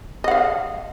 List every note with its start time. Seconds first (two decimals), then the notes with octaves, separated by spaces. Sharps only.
0.24 D#5
0.28 F#5
0.31 F5